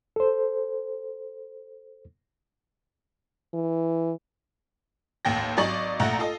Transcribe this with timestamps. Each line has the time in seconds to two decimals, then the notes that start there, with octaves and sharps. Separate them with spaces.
0.16 A4 C5
3.54 E3
5.25 A1 D#2 G5 A#6
5.57 G#1 F#3 D5 D#5 C#6 F#7
6.00 A#1 A3 F#5 A#5 A#6
6.19 F4 A4 D#5